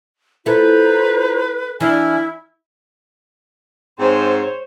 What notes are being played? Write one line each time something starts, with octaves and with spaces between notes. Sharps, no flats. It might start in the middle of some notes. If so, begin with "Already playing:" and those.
E4 F4 A4 B4 C5 A#5
E3 D4 E4 G#5 F6
G#2 C4 C5 C#5